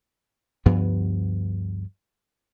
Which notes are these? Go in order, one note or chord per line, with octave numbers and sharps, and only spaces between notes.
D2 G2 F3 B3